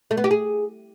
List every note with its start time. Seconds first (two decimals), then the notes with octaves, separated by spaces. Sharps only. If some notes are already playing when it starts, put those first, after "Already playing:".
0.11 A3
0.17 B3
0.24 G4
0.31 G#4